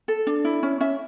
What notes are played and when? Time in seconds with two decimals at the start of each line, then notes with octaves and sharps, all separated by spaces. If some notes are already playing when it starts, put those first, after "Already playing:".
0.08 A4
0.27 D4
0.45 E4
0.63 C#4
0.80 C#4 E5